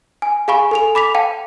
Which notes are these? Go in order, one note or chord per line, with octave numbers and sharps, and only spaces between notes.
G#5
G#4 F5 G#5 B5 C#6
A4 G#5 F7
B5 D6 B6 F7
F5 G5 A5